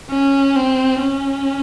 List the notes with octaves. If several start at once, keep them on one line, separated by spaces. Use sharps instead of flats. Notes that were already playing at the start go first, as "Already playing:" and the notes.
C#4
C4
C#4